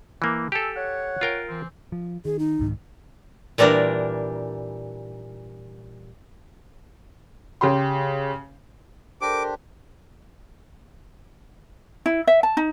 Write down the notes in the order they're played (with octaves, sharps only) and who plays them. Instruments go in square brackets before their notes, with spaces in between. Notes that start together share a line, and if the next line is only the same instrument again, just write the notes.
[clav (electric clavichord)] E3 A#3
[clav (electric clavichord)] G4 A4 [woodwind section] G#5 A5 E6
[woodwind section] C#5 F#5
[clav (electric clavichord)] F4 A#4 G5
[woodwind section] E3 C4
[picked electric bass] F3
[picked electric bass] D#3 [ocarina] G#4
[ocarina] D#4
[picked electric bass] C2 G#2 D#3
[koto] A#2 E3 G3 D4 A#4
[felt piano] C#3 G4 C6
[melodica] D4 G4 C5 [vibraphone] A4 A#4 [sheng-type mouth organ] D6
[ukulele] E4
E5
A5
D#4